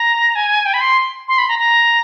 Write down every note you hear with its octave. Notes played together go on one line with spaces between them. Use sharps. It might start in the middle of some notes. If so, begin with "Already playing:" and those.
Already playing: A#5
G#5
G5
B5
C6
C6
B5
A#5
A#5